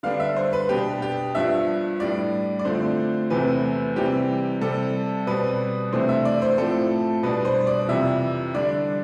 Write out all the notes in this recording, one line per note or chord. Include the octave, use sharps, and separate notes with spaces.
D3 G3 B3 D4 F5
E5
C5
B4
B2 B3 D4 G4
G4
G2 F3 B3 D4 E5
A2 G3 D4 D5
D5
D3 F3 A3 C4 C5
E2 C3 E3 A3 C4 B4
C3 E3 G3 C4 G4
C3 G3 C4 A4
B2 G3 C4 B4
C3 E3 A3 D4 C5
E5
D5
C5
A2 F3 A3 C4 A4
B2 G3 D4 B4
C5
D5
F2 C3 E3 E5
D3 G3 D4 D5